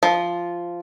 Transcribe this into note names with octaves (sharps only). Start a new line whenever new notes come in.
F3